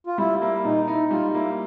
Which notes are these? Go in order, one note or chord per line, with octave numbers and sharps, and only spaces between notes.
F4
G3 E4
A#3 E4
A#2 D#4
D#4 E4
G3 F4
A#3 E4